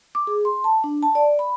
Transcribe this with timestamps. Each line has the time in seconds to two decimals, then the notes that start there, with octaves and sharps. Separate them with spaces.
0.15 D6
0.27 G#4
0.45 C6
0.64 A5
0.84 D4
1.03 A5
1.15 D5
1.39 B5